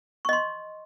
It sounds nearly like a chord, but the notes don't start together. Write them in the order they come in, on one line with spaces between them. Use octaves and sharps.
C#6 D#5 C6